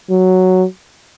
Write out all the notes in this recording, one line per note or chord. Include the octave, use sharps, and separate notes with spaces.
F#3